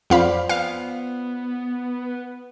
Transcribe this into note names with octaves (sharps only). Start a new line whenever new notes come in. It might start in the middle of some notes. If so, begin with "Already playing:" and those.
F2 F4 C5 D5 F5 B5
B3 F5